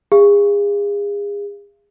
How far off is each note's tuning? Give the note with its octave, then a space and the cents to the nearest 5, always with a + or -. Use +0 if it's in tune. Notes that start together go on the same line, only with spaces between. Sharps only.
G#4 -35 F5 -35